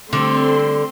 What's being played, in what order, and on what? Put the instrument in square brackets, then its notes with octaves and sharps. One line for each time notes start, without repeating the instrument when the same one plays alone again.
[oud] D3 G3 [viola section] A3 C4 C6